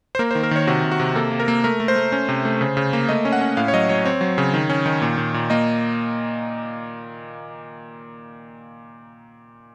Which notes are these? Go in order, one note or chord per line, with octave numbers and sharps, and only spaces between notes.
C5
A#3 A#4
D#3 C5
A#4
D#3 C#5
C3 F#4
C3
F#4
C3
A#3 A4
A#3
A#4
A#3
A3 A#4
A3
C5
A3
C#4
C3
A3
C#3
C#3
A#3
A3 D#5
C#4
F#5
C#4
A2 F5
C#5
F#3 D#5
F#3 C#5
C4 C#5
F#3
C#3
D#3
C#4
D#3
A#2
A#2
A#2
A#3 D#5